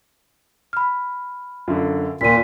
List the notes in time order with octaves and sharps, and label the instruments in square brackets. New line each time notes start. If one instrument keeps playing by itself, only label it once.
[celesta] B5 F6
[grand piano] F#2 D3 [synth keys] F4
[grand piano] D#2 [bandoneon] A#2 [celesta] B6 D#7